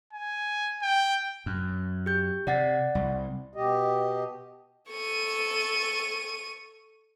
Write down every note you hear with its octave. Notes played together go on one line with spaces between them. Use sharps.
G#5
G5
F#2
G4 G6
C3 D5 F#5 A6
C2
B2 G4 D#5
A4 C#6 D#7